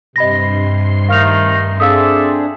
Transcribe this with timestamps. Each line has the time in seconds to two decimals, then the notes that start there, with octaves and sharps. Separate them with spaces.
0.16 G2 C3 D#5 B5 C6 A#6 C7
1.09 D#3 A3 D#4 F5 F6 F7
1.80 C4 D4 G#4 A4 D5 E5 F5 D#6